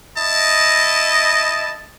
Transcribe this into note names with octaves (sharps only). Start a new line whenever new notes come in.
E4 D#5 A5